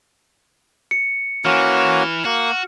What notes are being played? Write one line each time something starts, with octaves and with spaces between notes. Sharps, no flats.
C#7
E3 A#3 C#4 F#4 F6
A#3 F#4